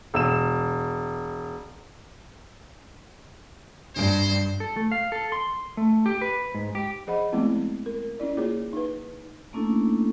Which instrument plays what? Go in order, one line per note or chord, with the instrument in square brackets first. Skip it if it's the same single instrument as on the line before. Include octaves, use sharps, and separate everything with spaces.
[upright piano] E1 E6 E7
[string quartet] G2 [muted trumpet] C5
[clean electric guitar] A4
A3
F5
A4
C6
A3
G4
B4
G#2
G4
[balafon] F3 G#4 C5 D#5 F#5 B5
F3 G#3 A3 B3 C4 E4
A#4
C#4 E4 D5
A#3 F4 G#4 C#5
D#4 B4
[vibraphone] A3 A#3 C#4 D4 E4 A4